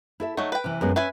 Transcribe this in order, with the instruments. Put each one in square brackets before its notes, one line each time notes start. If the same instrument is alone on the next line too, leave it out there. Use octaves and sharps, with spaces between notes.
[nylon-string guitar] E4 A4 E5
[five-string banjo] F#3 A3 [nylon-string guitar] D#4
[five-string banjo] B4 G5
[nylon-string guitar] C3 E3
F#2 G#3 B3
[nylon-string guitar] C#4 [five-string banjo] B4 E5 G#5